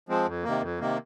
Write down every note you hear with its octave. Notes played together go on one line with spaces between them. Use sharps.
F3 G#3 C4
F2
C3 D#3 A#3
F2
C3 D#3 A#3